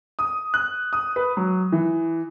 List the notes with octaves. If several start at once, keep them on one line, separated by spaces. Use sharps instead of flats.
D#6
F#6
D#6
B4
F#3
E3